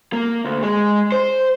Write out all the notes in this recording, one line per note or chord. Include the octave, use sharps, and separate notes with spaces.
A#3
D2
G#3
C5